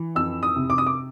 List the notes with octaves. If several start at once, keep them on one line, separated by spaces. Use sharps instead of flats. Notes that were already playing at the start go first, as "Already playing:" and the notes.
Already playing: E3
F2 E6
D#6
C3
D6
D#6
D6